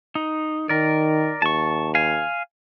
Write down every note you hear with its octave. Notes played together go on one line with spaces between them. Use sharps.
D#4
D#3 A#4 D5
D#2 A5 C#6
F5 G#5